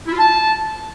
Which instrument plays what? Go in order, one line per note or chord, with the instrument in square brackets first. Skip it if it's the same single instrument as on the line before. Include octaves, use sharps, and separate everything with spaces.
[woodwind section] E4
F4
A5